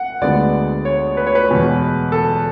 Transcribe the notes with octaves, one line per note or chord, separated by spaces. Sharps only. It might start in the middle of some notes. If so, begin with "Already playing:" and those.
Already playing: F#5
D2 D3 G#3 B3 D5
C#5
B4
C#5
B4
E2 B2 G#3
A4